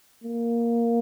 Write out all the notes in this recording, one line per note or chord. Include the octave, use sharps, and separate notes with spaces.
A#3